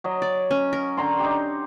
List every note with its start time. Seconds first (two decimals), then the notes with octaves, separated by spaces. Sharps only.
0.04 F#3 D#5
0.22 D5
0.51 C#4
0.73 A#4
0.97 D3 A#5 C6
1.20 D#4 G4